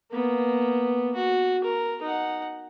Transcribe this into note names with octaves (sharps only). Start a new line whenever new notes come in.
A#3 B3
F#4
A#4
D#4 F#5